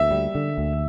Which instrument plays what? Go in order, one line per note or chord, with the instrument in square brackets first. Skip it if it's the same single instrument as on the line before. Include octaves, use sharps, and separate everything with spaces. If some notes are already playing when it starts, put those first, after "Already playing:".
Already playing: [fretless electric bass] D2 [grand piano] E5
[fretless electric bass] G3
D3
D2